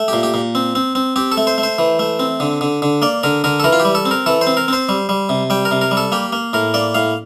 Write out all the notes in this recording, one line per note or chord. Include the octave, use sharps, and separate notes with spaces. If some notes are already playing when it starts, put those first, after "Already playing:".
Already playing: A3
A#2 G4
G4
A#2
C4
C4
C4
C4 G4
A4
A3
C5
A3
C5
E3
A3
C4
D3
D3
D3
A#3 D5
D3 A#4
D3 A#4
A4
E3 A#4
F4
G4
G3
A4
C4
A#4
E3 A4
C5
C4
A#4
C4 C5
G3
G3
C3
G3 G5
A#4
C3
A#4
G3
A4
A#3 G4
A#3
A2 A#4
A#3 D5
A2 F5